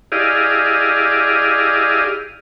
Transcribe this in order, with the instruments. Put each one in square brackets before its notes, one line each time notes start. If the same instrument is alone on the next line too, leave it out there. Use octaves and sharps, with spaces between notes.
[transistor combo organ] E4 G4 G#4 D5 D#5 F5